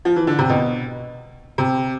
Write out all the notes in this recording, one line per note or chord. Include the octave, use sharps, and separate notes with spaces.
F3
E3
D3
C3
B2
C3